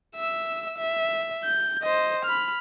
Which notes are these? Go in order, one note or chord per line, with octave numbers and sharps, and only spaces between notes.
E5 E6
E5
G6
C5 D#5
B5 F6